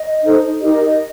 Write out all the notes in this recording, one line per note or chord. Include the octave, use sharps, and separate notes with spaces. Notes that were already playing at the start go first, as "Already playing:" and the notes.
Already playing: D#5
D#4 A4 C5
D#4 G4 A#4 D#5